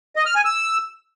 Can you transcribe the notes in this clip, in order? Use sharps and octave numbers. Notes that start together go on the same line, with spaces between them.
D#5
F6
G#5
E6